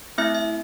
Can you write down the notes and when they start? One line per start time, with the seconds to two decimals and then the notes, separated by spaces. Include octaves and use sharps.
0.18 A3 C4 E4 E5
0.34 E5